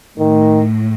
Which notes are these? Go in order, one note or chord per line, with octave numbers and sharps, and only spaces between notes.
A2 D#3